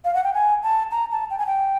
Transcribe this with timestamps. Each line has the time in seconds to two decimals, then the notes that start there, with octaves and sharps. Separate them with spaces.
0.05 F5
0.14 F#5
0.24 G5
0.34 G#5
0.63 A5
0.91 A#5
1.11 A5
1.30 G5
1.38 G#5
1.46 G5